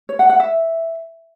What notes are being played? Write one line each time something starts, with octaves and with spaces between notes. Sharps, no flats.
C#5
F#5
F#5
E5